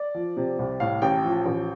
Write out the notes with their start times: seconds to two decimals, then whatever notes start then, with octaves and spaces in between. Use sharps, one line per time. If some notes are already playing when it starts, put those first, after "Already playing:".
Already playing: D5
0.15 F3
0.37 C3
0.59 C2
0.80 A2 F5
1.02 A1 G5
1.24 F3
1.46 A1